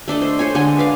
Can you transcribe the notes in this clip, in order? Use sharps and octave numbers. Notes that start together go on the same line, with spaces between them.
A3 D4 A4 D#5
C5
C5 C#5 G#5
D3 G#3 D#5 G#5
B4 D5 F5